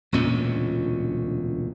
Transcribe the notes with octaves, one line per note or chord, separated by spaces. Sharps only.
E1 D2 A#2 C#4